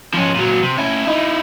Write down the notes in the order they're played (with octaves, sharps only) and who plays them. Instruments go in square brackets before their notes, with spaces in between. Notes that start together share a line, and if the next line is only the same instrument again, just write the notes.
[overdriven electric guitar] F3 C#4
A#2 F#3
C3
C#4 E4
D#4 E4